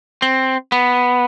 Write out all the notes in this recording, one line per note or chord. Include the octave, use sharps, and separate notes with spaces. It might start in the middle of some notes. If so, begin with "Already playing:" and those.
C4
B3